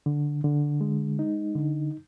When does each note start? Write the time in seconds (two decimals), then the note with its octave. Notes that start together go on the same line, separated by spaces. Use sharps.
0.06 D3
0.44 D3
0.81 G#3
1.19 D#4
1.55 D3